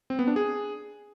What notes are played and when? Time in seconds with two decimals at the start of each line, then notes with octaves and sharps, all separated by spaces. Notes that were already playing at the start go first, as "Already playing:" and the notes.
0.10 C4
0.19 B3
0.27 D4
0.36 G#4